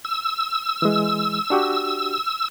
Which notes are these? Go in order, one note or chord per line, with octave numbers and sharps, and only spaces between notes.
E6
E3 G#3
D4 F#4 G4